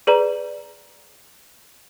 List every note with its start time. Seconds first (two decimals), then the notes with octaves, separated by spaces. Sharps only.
0.07 G#4 B4 D5 A#5